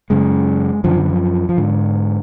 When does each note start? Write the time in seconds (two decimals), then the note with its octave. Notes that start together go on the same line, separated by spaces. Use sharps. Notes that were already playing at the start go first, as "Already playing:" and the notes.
0.10 F#2 C#3 G#3
0.84 F#2 D3 F3
0.97 D3
1.10 F3
1.49 F3
1.57 G#2 D3